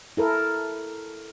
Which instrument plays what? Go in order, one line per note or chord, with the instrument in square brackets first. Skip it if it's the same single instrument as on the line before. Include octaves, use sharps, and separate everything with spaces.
[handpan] E4 A4 A#4